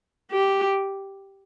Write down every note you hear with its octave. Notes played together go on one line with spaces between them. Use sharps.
G4